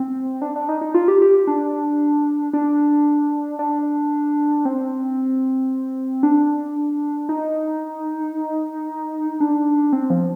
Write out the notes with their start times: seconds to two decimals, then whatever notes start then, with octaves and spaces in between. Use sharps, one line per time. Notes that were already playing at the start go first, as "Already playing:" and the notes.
Already playing: C4
0.42 D4
0.56 D4
0.69 D#4
0.81 D#4
0.94 F4
1.08 G4
1.22 G4
1.47 D4
2.53 D4
3.59 D4
4.65 C4
6.23 D4
7.29 D#4
9.40 D4
9.93 C4
10.10 F3